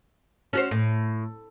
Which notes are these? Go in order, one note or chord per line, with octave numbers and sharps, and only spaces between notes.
C#4 F#4 C5
A2